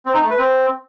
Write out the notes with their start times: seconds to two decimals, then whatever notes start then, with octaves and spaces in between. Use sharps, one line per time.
0.06 C4
0.14 D#4
0.22 A3
0.30 B4
0.38 C4